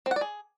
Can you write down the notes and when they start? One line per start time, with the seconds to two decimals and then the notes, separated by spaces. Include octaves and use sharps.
0.06 C4
0.11 F#5
0.16 D5
0.21 G#4